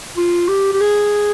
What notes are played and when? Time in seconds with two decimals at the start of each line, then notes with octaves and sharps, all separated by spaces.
0.17 F4
0.49 G4
0.73 G4
0.81 G#4